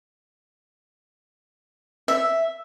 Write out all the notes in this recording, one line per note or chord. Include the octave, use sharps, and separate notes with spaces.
E5